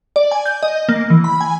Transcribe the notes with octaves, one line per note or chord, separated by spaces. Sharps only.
D5
G#5
G6
D#5
A#3
E3
B5
G#5